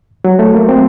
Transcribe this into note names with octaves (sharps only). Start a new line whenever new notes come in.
F#3
A3
A#3
C4